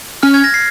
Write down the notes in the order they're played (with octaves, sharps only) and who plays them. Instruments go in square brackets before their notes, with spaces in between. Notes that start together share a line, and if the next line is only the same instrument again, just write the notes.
[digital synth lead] C#4 [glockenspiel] F6
[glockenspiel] G#6
A#6
C7